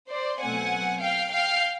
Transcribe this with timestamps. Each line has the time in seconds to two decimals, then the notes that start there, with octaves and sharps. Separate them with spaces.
0.10 C5 D5
0.41 B2 F#3 A3 C4 F#5 G#5
1.02 F5 G5
1.33 F5 G5